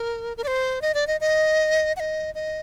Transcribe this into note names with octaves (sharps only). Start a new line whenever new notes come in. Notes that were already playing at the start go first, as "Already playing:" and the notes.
Already playing: A#4
A#4
D5
C5
D#5
D5
D#5
D#5
F#5
D#5
D#5